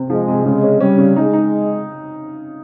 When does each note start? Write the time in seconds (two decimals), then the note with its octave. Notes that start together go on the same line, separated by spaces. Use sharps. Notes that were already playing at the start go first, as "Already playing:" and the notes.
Already playing: C3 C4
0.10 F3 G#3
0.28 C3
0.45 C#3 G#3
0.63 C#4
0.80 G3 C#4
0.98 C#3
1.16 G#3 D#4
1.33 D#4